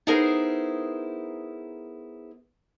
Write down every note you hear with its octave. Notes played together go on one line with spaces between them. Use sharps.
B3 D#4 E4 G#4 A#4 C5